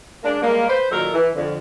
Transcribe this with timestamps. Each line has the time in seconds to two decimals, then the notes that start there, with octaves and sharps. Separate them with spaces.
0.24 G#3 A#3 D4
0.42 G3 G#3 A#3
0.69 B4 C5
0.91 A#2 D#3 F#3 A4 A#4
1.14 E3
1.36 F2 D3